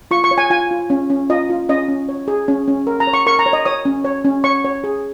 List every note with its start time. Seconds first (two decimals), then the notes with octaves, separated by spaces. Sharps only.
0.11 F4 C#6
0.24 C#6
0.31 C#5
0.38 G#5
0.50 F4 G#5
0.71 F4
0.90 C#4
1.10 C#4
1.30 F4 D#5
1.50 F4
1.69 C#4 D#5
1.88 C#4
2.09 C#5
2.28 G#4
2.48 C#4
2.68 C#4
2.87 A#4
3.00 A#5
3.07 C#5
3.14 C#6
3.26 A#4 C#6
3.39 A#5
3.46 C#5
3.53 D#5
3.65 C#5 D#6
3.85 C#4
4.05 C#5
4.25 C#4
4.44 C#5 C#6
4.65 C#5
4.84 G#4